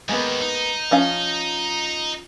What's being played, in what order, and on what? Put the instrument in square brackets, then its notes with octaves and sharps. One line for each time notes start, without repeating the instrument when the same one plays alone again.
[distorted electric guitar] D#2 [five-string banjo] G#3 A#3 B3
[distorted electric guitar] D#4
[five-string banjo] F3 C#4 F5